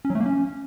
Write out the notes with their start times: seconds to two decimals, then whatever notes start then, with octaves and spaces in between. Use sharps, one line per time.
0.05 C#4
0.10 F#3
0.15 A3
0.20 A#3
0.26 C#4